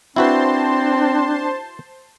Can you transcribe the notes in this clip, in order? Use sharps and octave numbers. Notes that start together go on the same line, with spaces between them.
C4 D4 E4 F#4 B4 C5 A5 C6